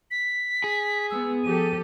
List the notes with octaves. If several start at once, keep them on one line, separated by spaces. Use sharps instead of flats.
B6
G#4
G#3 B3 E6
F3 G4 A4 D#7